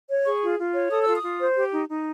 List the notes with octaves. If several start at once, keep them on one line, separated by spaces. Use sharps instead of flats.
C#5
G#4 C#6
F4
F4
C#5
A4 D#6
F4 E6
D#6
F4
C5
G4
D#4
D#4